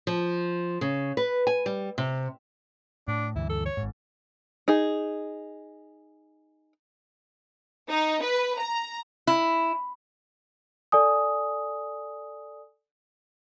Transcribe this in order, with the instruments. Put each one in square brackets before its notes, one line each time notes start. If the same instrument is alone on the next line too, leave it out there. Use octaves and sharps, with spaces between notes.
[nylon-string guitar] F3
C#3
B4
G#5
G3
C3
[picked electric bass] A2 [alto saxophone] D4
[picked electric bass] D2 G2 E3 [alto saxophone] E4
[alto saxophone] A4
C#5
[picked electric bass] G#1 G#2
[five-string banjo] D#4 G#4
[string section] D#4
B4
A#5
[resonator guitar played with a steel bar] E4
[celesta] A4 D5 G#5 D#6